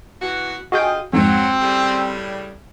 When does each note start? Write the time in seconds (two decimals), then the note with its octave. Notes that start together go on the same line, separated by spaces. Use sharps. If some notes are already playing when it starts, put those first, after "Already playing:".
0.22 B2 E3 F#4
0.72 D2 F4 F#4 G#4 D#5 G5
1.13 F2 G#2 F#3 C4
1.61 A2 C#3 G3